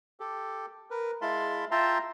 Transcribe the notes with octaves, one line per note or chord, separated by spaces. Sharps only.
G4 A4
A#4 B4
G#3 E4 F5 A5 B5 C6
F4 E5 G5 A5 A#5 C6